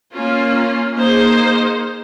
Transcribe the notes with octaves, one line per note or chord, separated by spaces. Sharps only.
A#3 C#4 F4
A#3 D#4 G#4 C5